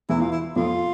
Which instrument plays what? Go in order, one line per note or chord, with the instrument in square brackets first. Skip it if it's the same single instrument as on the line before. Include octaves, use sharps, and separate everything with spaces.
[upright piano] E2 E3 [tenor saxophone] E4
[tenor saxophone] F4
E4
[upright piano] F2 F3 [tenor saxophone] F4